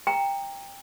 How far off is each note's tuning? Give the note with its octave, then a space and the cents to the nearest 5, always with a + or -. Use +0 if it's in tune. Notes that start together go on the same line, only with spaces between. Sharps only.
G5 +20 A#5 +0